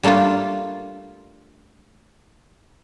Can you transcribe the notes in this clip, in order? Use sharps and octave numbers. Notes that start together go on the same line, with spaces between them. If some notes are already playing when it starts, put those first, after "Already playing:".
G3 A3 A#3 D4 F4